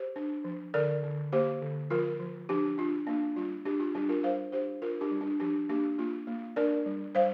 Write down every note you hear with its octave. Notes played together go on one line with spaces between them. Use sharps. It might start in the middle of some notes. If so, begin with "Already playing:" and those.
Already playing: G4 C5
D4
F3
D3 A#4 D5
D3
A#3 G4 C5
D3
F3 F4 A#4
F3
F3 D4 G4
D4 F4
A#3 D4
G3 F4
D4 G4
F4
G3 D4 G4
F4 A#4
G3 C5 F5
D4 G4 C5
D4 F4 A#4
D4 G4
G3
D4
F3 D4 G4
A#3 D4 G4
A#3 F4
A#3
D4 A#4 D5
G3
G3 C5 F5